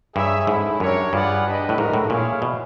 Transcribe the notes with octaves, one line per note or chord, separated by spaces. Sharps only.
G2 D#4 G#4 C#5 E5
G#2 A3 C#4 E4
F#2 D4 G4 A#4 C#5
G2 F4 G#4 B4 D5 F#5
D4 G4 B4 D#5
A2
G#2 A3 D4 F#4 A#4
A2
A#2 E4 G#4 C#5 F5
B2